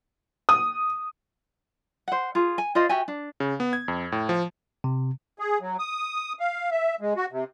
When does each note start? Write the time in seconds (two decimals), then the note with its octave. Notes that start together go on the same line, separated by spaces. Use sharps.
0.49 D#6
2.08 C5 F#5
2.35 F4 G#4
2.58 G#5
2.75 F4 C5 D5 D#5
2.89 F#4 G4 E5 G#5
3.08 D4
3.40 C#3
3.60 B3
3.73 G#6
3.88 F2
4.12 A2
4.29 F3
4.84 C3
5.39 G#4
5.61 F#3
5.79 D#6
6.40 F5
6.71 E5
7.01 G#3
7.16 F#4
7.32 C3